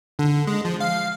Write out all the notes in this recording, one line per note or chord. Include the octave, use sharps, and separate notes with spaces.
D3
G#3
F3
F5